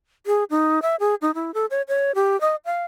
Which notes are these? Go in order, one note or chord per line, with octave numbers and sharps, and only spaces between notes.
G#4
D#4
E5
G#4
D#4
E4
A4
C#5
C#5
G4
D#5
F5